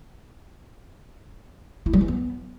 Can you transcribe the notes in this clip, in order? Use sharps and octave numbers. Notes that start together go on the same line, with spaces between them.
E4
G3
E3
B3